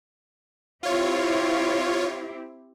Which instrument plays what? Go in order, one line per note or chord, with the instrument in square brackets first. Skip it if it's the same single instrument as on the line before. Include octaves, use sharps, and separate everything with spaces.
[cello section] C4 E4 G4 [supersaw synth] F4 C#5